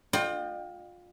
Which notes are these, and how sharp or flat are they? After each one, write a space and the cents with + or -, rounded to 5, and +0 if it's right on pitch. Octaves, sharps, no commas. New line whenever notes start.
F4 +25 D#5 -40 G5 +0